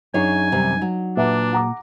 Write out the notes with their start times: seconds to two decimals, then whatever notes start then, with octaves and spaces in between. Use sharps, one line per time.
0.14 F#2 D4 D#4 G#4 C#5 G#5
0.52 C3 D#3 G3
0.81 F#3
1.17 A#2 D4 B4 E5 F#5
1.53 F#5 A#5 D6